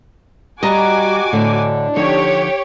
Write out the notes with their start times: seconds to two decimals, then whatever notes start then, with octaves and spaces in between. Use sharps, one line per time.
0.63 G3 F#4 G4 D#5 G#5 A#5 D6
1.33 A2 D3 D4
1.96 D3 F3 D#4 G4 C#5